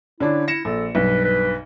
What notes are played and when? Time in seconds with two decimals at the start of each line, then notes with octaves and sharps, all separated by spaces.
0.20 D3 C#4 D4 E4
0.48 E4 A#6 C#7 E7
0.65 A#1 A4
0.95 B1 G2 B4
1.24 B4